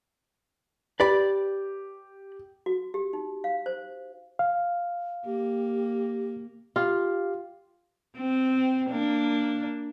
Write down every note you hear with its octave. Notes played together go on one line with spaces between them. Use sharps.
G4 B4 D5 B5
F#4
G4
D#4
F5
C5
F5
A#3 G4
F4 G4 F5
C4
A#3 D4